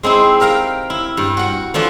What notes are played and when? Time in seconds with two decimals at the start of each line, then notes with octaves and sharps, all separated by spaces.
0.03 G#3 C4 D#4 E4
0.40 G4 A#4 F5 G5 A#5
0.90 E4
1.17 G2
1.37 F#4 F#5
1.74 E3 F3 A3 D4